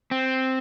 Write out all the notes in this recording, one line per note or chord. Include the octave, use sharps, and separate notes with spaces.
C4